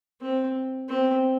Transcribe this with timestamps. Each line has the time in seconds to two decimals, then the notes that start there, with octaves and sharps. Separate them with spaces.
0.21 C4
0.89 C4